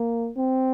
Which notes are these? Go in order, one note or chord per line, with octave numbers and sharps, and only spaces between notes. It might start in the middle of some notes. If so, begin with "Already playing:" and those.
Already playing: A#3
C4